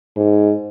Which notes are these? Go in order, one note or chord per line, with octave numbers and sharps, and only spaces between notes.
G#2